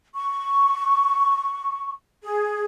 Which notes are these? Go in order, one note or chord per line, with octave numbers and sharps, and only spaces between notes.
C#6
G#4